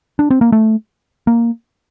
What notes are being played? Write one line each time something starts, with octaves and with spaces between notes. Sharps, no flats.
D4
C4
A#3
A3
A#3